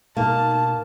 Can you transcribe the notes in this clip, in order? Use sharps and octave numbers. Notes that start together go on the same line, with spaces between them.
B2 A#3 D#4 A5